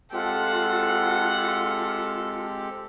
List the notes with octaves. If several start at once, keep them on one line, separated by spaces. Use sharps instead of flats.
G#3 C4 F4 G4 A4 F#5